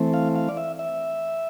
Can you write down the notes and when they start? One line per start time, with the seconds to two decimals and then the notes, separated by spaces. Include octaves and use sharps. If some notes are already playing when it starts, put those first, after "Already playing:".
Already playing: E3 A3 C4
0.14 F5
0.35 F5
0.49 D5
0.57 E5
0.79 E5